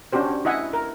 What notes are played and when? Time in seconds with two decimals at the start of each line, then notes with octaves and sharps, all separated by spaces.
0.13 C#4 D4 F#4 G4 C5
0.45 E4 D#5 E5 F#5 G#5
0.73 A#4